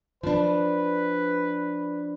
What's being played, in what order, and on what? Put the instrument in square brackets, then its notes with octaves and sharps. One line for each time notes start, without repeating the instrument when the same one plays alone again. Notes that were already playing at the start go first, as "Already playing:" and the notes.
[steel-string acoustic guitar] F3 D4 [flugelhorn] B4